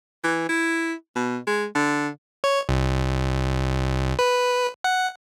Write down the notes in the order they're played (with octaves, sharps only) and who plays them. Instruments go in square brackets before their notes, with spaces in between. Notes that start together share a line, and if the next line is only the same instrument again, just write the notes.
[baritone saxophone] E3
E4
B2
G#3
D3
[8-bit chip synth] C#5
C2
B4
F#5